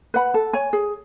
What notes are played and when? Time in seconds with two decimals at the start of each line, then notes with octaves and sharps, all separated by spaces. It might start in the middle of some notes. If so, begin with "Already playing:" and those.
0.14 B4 F#5 B5
0.34 A4
0.53 C#5 G#5
0.73 G#4